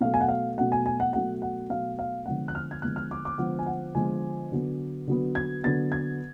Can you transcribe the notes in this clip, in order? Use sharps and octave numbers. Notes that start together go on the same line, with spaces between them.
B2 F#3 A3 F5
G#5
F#5
F5
B2 F#3 A3 F#5
G#5
G#5
F#5
B2 F#3 A3 F#5
F#5
B2 F#3 A3 F5
F5
D3 F3 G#3 B3 F#5
F#6
F6
G#6
D3 F3 G#3 B3 F#6
F6
D6
D6
D3 F3 G#3 B3 F#5
G#5
F#5
D3 F3 G#3 B3 G#5
D3 F#3 B3
D3 F#3 B3
G#6
D3 F#3 B3 A6
G#6